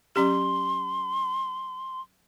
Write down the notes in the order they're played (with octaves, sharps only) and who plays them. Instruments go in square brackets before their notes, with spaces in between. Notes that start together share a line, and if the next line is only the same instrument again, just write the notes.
[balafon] F#3 C#4 G4 [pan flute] C6